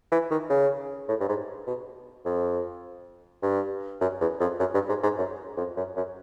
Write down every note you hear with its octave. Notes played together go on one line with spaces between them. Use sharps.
E3
D#3
C#3
A2
G2
G#2
B2
F2
G2
F#2
E2
F2
F#2
G2
G#2
G#2
F#2
F2
F#2
F#2